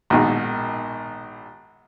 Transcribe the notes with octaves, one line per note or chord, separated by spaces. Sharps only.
A#1 G#2 B2 D#3